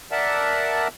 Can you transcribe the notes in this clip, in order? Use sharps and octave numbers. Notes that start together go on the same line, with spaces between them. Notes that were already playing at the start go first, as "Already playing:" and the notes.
A#4 D5 E5 F#5 A5